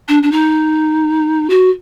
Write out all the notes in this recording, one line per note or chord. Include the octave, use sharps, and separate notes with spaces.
D4
D4
D#4
F#4